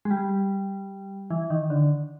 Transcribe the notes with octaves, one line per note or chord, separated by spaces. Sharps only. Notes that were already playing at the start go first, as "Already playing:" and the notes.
G#3
G3
E3
D#3
D3